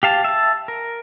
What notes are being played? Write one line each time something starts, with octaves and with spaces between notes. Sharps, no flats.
G4 F5 A5
E5 A5
A#4